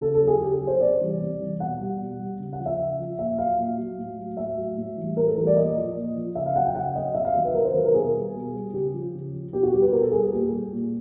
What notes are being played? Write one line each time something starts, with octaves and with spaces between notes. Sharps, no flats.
C#3 A4
A4
F#3
G#4
C#3 G4
F#3
C5
C3 D5
E3 G3
C3
E3 G3
B2 F#5
G3
B2
G3
C#3
F#5
F3
E5
C#3
F3
A#2 E5
F#3 F5
A#2
F#3
A2
F#3
A2 E5
F#3
A2
E3 G3
A2 A#4
A4
E3 G3 A#4
D5
A#2 D#5
F3
A#2
F3
C#3 E5
F5
F#3 F#5
G5
C#3 F#5
F#3 D#5
C3 E5
F5
D#3 F#3 E5
B4
C3 A#4
C5
D#3 F#3 B4
A#4
B2 G#4
G3
B2
G3
C#3 G4
F3
C#3
F3
B2 G4
F#4
G3 G4
B4
B2 A#4
A4
G3 G#4
G#4
A#2 G4
G3
A#2